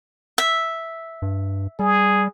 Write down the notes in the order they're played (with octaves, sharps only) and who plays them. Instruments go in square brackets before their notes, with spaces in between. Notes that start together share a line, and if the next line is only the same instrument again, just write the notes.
[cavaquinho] E5
[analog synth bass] G2
[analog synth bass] G3 [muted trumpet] G#4